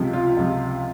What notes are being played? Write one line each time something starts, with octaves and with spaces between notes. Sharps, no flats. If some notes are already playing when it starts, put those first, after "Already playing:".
Already playing: C#2 C3 F3
F4
C#2 C3 F3